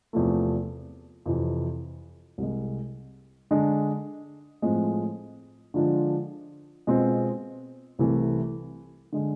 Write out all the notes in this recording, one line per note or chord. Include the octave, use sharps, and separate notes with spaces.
E2 C3 F3 A3
F2 C3 E3
C2 C3 G#3
D3 G#3 D4
A2 F3 G#3 C4
D3 F3 G#3 D4 F4
B2 G#3 C4 F4
C2 C3 E3 A3
D3 G#3